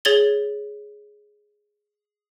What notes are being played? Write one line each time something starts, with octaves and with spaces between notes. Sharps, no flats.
G#4 C#5 G#6 A6 F#7 G7